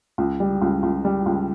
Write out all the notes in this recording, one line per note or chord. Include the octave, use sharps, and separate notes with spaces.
C#2
G3
C#2
C#2
G3
C#2